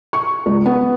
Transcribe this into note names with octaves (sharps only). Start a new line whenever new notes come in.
C#6
C#2
B3